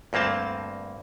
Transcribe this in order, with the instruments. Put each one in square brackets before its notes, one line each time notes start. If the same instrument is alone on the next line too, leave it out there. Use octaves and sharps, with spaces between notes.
[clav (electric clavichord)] D2 G2 A#3 C4 A5